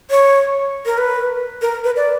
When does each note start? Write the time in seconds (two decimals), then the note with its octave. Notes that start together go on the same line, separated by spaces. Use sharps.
0.11 C#5
0.86 A#4
0.98 B4
1.62 A#4
1.84 B4
1.96 D5